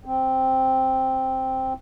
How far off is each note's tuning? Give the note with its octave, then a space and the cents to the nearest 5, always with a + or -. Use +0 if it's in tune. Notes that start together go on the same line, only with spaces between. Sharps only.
C4 +0